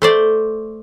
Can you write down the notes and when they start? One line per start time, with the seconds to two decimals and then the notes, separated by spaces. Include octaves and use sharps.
0.02 A3 C5 D5